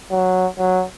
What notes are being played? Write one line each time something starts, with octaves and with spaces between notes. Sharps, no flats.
F#3
F#3